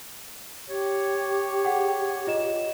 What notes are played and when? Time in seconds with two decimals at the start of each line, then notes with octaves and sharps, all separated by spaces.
0.69 G4 C#5
1.65 G#4 F#5 G5
2.27 F4 D#5 E7